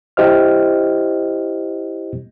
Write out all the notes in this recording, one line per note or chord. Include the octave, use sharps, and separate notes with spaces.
E4 G4 C5 D#5 F6